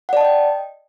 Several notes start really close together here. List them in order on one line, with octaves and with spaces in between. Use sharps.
F#5 D5 A5 D#5 G5